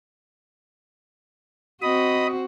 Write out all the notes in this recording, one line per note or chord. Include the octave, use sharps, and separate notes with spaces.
C4 F#4 D#5 B5 D#6